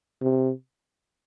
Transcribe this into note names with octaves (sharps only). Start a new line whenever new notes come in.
C3